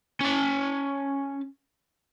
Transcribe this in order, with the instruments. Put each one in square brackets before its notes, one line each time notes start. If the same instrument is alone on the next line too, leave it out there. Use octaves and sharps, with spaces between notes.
[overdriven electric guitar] C#4 A5